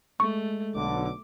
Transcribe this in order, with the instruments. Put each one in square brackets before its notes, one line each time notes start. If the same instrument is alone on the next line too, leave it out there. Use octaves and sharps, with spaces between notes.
[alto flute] G#3 [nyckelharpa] A3 [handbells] C#6
[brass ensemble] B1 D3 [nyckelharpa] D6